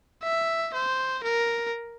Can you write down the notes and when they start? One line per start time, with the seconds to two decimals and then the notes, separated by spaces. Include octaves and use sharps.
0.23 E5
0.74 C5
1.24 A#4